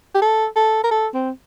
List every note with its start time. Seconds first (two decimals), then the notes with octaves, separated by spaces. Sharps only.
0.15 G4
0.22 A4
0.56 A4
0.84 A#4
0.91 A4
1.14 C4